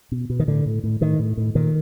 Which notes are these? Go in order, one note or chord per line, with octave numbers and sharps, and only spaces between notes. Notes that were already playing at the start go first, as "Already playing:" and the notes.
B2
B2
D#3
A2 D3
A2
A2
A2 D#3
A2
A2
A#2 D#3